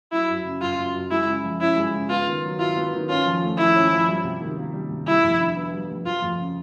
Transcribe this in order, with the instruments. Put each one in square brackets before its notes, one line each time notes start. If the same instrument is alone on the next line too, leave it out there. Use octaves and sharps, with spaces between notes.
[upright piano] F#3 [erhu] E4
[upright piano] F#2
C#3
[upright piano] F#2 [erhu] F4
[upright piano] F#3
F#2
[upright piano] G#3 [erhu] E4
[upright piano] C#3
F3
[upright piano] C#4 [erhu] E4
[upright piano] G#3
C#3
[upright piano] B3 [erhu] F4
[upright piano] D#3
F#3
[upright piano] E4 [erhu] F4
[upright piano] B3
D#3
[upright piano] C#4 [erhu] F4
[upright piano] F3
A3
[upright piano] F3 [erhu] E4
[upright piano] C#4
F3
G3
C3
D#3
A#3
G3
C3
[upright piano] G3 [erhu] E4
[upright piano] F2
D3
B3
G3
F2
[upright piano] F3 [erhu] F4
[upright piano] F2
C#3